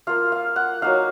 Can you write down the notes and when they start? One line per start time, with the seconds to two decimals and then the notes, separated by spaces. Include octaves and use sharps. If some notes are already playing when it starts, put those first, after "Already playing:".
0.07 A#3 F4 F5
0.32 F5
0.56 F#5
0.82 F#3 A#3 D#4 F5